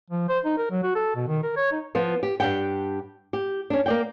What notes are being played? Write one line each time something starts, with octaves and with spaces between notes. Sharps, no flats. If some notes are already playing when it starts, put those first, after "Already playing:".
F3
C5
D#4
A#4
F#3
F#4
A4
B2
D#3
A#4
C#5
D#4
F3 B3 F4
G4
G2 D4 G4 F#5 G5
G4
C#4 D4
A#3 D5 G5